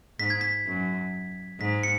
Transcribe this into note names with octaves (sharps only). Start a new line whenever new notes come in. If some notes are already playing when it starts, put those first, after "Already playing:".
G#2 B6
G#6
B6
F#2
G#2 B6
C#7